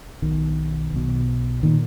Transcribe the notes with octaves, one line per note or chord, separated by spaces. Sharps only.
B1 B2 D#3
B1 B2
A#2 D#3